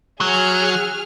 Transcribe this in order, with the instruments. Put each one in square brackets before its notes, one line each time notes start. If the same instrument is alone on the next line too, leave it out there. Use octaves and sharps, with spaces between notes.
[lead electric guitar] F#3 [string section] G#4 F6